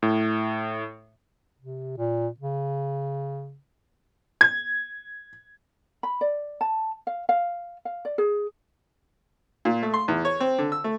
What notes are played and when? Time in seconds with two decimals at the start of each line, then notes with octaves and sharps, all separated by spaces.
0.03 A2
1.60 C3
1.98 A#2
2.40 C#3
4.41 G#6
6.03 B5
6.21 D5
6.61 A5
7.07 F5
7.29 F5
7.85 F5
8.05 D5
8.18 G#4
9.65 A#2
9.83 A3
9.94 C6
10.08 E2
10.25 C#5
10.40 C4
10.58 D3
10.72 E6
10.84 A3